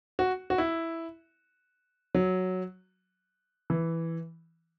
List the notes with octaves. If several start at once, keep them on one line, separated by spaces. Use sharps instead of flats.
F#4
F#4
E4
F#3
E3